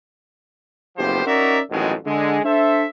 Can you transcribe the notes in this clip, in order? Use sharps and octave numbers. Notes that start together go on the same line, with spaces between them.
F#1 A2 F3 B3 G4 C5
C#4 D#4 F#4 A#4 D5 E5
A1 F2 B2 D#3 F#3 G#3
D3 G#3
D4 A4 C5 E5